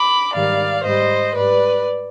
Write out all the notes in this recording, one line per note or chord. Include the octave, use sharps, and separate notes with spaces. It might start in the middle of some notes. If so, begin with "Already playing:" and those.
Already playing: B5 D6
G#2 D#3 G3 D5 F5
G#2 G3 C5 D#5
G#2 G3 B4 D5